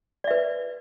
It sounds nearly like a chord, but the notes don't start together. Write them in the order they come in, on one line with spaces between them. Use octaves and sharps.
D5 E5 B4